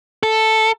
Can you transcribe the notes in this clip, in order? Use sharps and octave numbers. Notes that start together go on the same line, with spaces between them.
A4